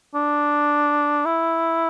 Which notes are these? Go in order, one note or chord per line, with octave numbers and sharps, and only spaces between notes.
D4
E4